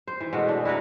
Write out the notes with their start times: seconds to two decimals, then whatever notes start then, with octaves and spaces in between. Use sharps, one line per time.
0.07 C5
0.20 E3
0.33 B2 G#3 A3 F#4
0.48 D4
0.65 E4 F#4 A#4 B4